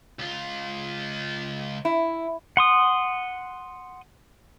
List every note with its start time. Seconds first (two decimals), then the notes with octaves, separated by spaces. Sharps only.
0.19 C#2 F4
1.85 E4
2.57 F#5 C6 D#6